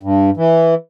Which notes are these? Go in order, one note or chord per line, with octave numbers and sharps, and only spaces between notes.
G2
E3